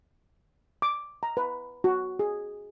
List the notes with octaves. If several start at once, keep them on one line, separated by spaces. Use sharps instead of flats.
D6
A#5
B4
F#4
G#4